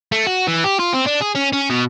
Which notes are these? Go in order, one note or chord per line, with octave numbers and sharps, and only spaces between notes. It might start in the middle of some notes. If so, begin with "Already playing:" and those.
A3
F#4
E3
G4
F4
C4
D4
G#4
C#4
C#4
B2